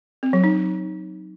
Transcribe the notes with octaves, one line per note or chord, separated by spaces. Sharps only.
C4
F#3
D#4